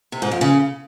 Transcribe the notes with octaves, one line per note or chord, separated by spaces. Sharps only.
C3
G#2
F2
C#3